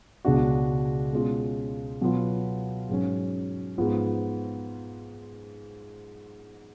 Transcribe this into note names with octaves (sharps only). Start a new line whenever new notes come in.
C#2 B2 G#3 D4 F#4
B2 G#3 C#4 F4
B2 F#3 B3 F4
G#2 F#3 C#4
G#2 F3 B3 F4